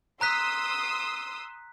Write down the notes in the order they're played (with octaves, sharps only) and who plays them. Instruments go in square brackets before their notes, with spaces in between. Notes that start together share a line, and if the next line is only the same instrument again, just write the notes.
[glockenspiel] A#5 F#6 B6 [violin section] C6 D#6 E6